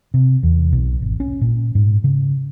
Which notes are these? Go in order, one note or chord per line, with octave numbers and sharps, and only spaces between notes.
C3
E2
B1
G#1
C#4
A#2
G#2
C#3